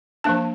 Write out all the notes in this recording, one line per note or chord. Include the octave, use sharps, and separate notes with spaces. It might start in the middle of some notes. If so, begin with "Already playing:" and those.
F3 A#3 D4 A5